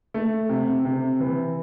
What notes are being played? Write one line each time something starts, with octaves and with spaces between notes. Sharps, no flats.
A3
C3
C3
E3